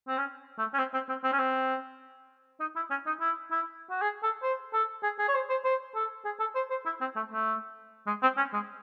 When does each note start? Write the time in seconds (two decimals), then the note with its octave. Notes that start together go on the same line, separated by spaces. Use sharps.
0.08 C4
0.18 C#4
0.58 A3
0.74 C#4
0.78 C4
0.94 C4
1.09 C4
1.24 C4
1.33 C#4
1.39 C4
2.60 D#4
2.76 E4
2.90 C#4
3.07 D#4
3.21 E4
3.52 E4
3.90 F#4
4.02 G#4
4.23 A4
4.43 C5
4.73 A4
5.03 G#4
5.19 G#4
5.29 C#5
5.35 C5
5.50 C5
5.65 C5
5.95 A4
6.25 G#4
6.40 A4
6.55 C5
6.70 C5
6.85 E4
7.01 C4
7.16 A3
7.32 A3
8.07 G#3
8.23 C4
8.37 C#4
8.53 G#3